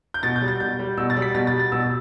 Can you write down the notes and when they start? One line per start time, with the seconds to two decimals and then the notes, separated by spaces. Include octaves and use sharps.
0.14 G6
0.23 B2 A6
0.36 G6
0.41 G3
0.48 A6
0.60 B2 G6
0.79 G3
0.97 B2 E6
1.10 A6
1.16 G3
1.22 B6
1.34 B2 A6
1.47 A6
1.53 G3
1.59 A6
1.72 B2 E6